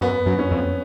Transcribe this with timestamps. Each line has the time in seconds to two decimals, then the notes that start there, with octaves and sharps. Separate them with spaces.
0.01 F#2 B3
0.26 F#2
0.39 C#4
0.51 F2